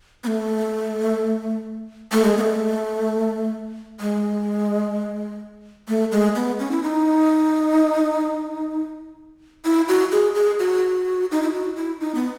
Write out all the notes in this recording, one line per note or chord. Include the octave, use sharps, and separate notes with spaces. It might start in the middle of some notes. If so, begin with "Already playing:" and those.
B3
A3
A3
G#3
B3
A3
G#3
A3
G#3
B3
C#4
E4
D#4
E4
F#4
G#4
G#4
F#4
D#4
E4
F#4
E4
D#4
B3